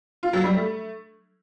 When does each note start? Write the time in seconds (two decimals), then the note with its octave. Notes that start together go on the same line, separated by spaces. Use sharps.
0.23 F4
0.33 F#3
0.44 G3
0.54 A3